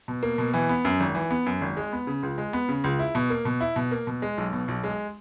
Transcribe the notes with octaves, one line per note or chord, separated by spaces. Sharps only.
B2
A#3
B2
E3
B3
F#2
G#1
E3
B3
F#2
G#1
G#3
B3
C#3
C#2
G#3
B3
C#3
C#2
E4
B2
A#3
B2
E4
B2
A#3
B2
G#3
B1
B2
B1
G#3